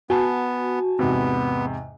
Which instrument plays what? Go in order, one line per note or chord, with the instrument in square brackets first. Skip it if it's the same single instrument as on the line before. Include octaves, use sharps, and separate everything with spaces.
[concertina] B3 [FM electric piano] F#4 [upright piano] G#5 A5
[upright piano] E2 G#2 C3 [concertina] B3